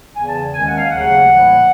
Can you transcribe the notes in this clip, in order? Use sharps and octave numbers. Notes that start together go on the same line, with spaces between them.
E2 C#3 E3 G#5
A5
D#2 D#3 G#3 C#4 G#5
F#5
F5
D#2 C#3 F#3 A3 F#5
A2 E3 G3 A#3